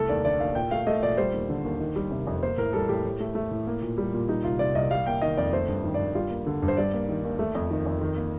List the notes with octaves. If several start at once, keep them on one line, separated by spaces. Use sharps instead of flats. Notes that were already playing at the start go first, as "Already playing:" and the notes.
Already playing: C2 A3 A4
D#2 D5
D3 D5
D#2 F5
A#2 G5
A3 F5
A3 D#5
A#2 D5
G3 C5
D#2
D3
D#2
D#3
G3
C3
F2
A#3 C5
A2 A#4
G3 A4
A2 G4
A2
A3
A3
A2
A#3
A#2
G3
A#2
G3 D#4
C2 F4
C3 D5
C2 D#5
G3 F5
A#3 G5
D#3 D#5
F2 D5
A3 C5
G2
D#3
G2 D5
G3 F4
A#3
D3
G2
C5
G3 D5
A#3
D#3
D#2
A3
F2
D#3
F2
D#3
A#3